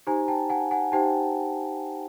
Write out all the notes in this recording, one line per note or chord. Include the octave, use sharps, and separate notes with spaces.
D#4 G4 C5 G#5 A#5
G5 A5
F#5 G#5
F#5 G#5
D#4 G4 C5 G5 A5